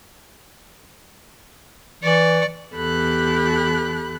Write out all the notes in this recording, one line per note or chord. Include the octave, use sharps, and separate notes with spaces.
E3 D5 C#6
E2 G4 A4 B5 F#6